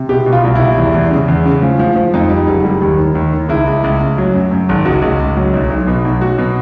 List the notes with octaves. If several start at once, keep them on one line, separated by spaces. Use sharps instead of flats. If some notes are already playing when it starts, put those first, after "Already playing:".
Already playing: C3
B2 G4
B2
F4
C2
C2 E4
E2
E2
C#3
E2
C#3
F3
F3
F3
F2 D#4
G3
F#1
G3
D#2
D#3
D#2
D#3
C#2 E4
C#2
C#2
C#2
F#3
F#2
F#2
G#1
C#2 F#4
C#2
C#2
F#3
B1
B1
B2
B1
F#3 F#4
B2